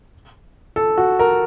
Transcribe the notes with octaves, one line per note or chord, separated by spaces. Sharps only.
A4
F#4
A#4